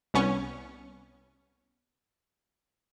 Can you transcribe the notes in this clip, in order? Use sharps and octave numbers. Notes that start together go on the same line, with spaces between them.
C2 B3 C#4 C#6